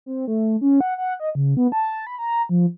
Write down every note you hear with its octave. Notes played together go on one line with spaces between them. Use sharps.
C4
A3
C#4
F#5
F#5
D#5
C#3
B3
A5
B5
A#5
F3